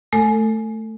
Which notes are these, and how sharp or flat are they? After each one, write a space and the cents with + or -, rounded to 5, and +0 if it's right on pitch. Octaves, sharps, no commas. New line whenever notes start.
A3 +0 A4 +35 G#5 +20